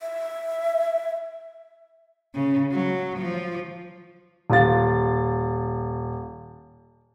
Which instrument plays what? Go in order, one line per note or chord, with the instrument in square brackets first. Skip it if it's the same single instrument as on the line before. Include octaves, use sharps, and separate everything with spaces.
[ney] E5
[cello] C#3
F#3
F3
[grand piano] D#1 F4 A6